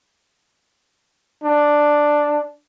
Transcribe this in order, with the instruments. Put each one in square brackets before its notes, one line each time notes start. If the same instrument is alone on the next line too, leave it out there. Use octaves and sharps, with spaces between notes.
[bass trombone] D4